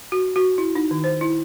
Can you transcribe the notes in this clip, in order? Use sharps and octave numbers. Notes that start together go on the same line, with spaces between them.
F#4
F#4
E4
D#4
D#3
C5
E4